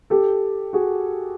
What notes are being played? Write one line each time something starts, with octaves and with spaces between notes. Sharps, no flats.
G4 A4
F#4 G#4